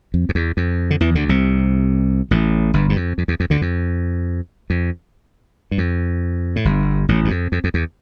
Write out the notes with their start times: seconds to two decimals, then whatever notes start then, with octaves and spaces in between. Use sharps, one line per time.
0.14 F2
0.29 F2
0.35 E2
0.57 F2
0.91 D3
1.00 E2 E3
1.15 D2 D3
1.29 C2 C3
2.31 A1 A2
2.74 G1 G2
2.89 G2
2.96 F2
3.18 F2
3.28 E2
3.40 F2
3.50 D2 D3
3.62 F2
4.70 F2
5.71 G2
5.78 F2
6.56 A2
6.65 G1 G2
7.09 A1 A2
7.25 G2
7.30 F2
7.52 F2
7.64 F2
7.74 E2